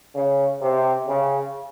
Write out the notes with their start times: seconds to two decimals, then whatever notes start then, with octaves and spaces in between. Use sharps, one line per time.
0.15 C#3
0.62 C3
1.08 C#3